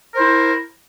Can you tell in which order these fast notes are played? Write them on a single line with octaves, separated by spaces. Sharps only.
A#4 C5 E4